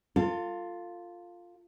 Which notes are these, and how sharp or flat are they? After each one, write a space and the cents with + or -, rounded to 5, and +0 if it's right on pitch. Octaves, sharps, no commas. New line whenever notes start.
F4 +5 A4 +35